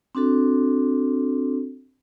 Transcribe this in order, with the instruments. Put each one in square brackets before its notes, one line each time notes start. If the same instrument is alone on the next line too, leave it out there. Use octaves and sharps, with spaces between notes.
[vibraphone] C4 D4 F#4 A4